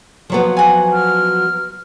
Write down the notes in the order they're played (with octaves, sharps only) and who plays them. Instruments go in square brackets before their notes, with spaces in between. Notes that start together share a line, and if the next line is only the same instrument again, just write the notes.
[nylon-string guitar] F3 F#3 B3
[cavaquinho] F#5 G#5
[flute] F6